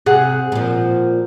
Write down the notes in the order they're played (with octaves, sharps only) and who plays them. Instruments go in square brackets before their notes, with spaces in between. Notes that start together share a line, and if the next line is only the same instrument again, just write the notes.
[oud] C3 [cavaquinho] G#4 F#5
[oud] A#2 F3